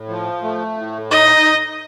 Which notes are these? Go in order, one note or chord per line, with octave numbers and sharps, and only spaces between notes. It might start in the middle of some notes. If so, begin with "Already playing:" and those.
Already playing: A2
F3
A3
A2
D#4 D#5